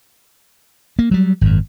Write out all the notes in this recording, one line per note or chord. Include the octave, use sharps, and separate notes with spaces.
A#3
F#3 G3
G#1 F#2